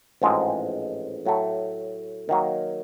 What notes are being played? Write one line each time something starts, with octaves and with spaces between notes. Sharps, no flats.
A1 G#2 F3 G#3 C4
A2 F#3 A3
D#3 F#3 A#3